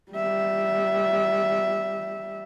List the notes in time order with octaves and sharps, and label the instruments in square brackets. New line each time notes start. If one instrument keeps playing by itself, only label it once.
[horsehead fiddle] G3 E5